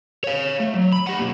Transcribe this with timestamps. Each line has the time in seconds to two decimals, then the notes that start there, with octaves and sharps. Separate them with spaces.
0.24 C#5 F5
0.60 A3
0.74 F#3
0.93 B5
1.07 G4 F#5
1.19 B1 A#3